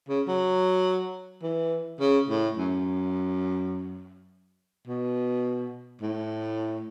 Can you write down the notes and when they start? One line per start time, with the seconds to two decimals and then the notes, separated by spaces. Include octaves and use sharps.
0.08 C#3
0.28 F#3
1.43 E3
2.00 C#3
2.29 A2
2.57 F#2
4.87 B2
6.01 A2